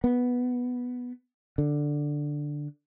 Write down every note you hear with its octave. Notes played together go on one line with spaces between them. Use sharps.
B3
D3